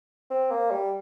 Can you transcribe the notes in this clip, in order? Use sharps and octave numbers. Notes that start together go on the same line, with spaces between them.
C4
A#3
G3